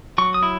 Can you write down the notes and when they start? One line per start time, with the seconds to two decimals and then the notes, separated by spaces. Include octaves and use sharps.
0.18 F#3 C#6
0.34 D#6
0.43 E4